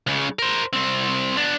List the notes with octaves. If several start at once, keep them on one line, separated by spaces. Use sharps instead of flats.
C#2 C#3
A#4 C5
C2 C4
B3 D4